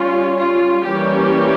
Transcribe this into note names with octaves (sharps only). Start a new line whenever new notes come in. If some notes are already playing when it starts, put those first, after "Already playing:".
Already playing: G3 C#4 F4
F4
E3 G3 A#3 C#4 G4